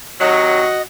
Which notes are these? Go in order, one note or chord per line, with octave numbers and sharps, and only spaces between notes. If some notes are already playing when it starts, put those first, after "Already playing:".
C3 D#3 F#3 F#4 D#5